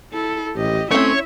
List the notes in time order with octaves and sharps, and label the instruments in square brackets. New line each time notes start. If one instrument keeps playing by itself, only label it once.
[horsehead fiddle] E4 A4
[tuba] A1 [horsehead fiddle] G4 D#5
[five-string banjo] A3 C4 [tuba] C#4 [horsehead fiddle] E4 E5 [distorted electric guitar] C#5